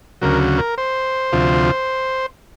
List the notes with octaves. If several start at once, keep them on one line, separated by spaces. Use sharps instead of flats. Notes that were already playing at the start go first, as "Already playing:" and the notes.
D2 C#3 F#3 A#4
A#4
C5
D2 C3 F3